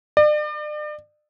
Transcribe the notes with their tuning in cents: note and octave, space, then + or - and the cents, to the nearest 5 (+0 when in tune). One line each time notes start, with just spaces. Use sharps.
D5 +40